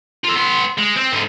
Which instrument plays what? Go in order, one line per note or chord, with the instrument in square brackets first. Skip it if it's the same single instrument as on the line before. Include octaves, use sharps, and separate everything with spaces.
[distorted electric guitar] F4 A4
B3 C6
G#3
C4
G#2 D3